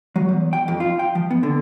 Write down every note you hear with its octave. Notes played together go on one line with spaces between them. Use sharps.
F#3
E2
G5
F2
F4
G5
F3
B3
D3